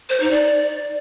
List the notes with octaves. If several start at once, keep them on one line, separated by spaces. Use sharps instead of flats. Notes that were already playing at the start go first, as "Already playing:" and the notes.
C5
D#4
D5